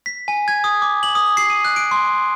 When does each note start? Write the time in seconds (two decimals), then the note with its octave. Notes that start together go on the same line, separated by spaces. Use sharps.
0.06 B6
0.28 G#5
0.48 G#6
0.64 D#6
0.82 D6
1.03 F#7
1.15 D#6
1.37 C7
1.50 D#7
1.65 F#6
1.76 D7
1.91 C6